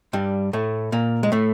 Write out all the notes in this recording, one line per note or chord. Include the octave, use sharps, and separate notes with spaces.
G2 G3
A2 A3
A#2 A#3
G#3
A2 A3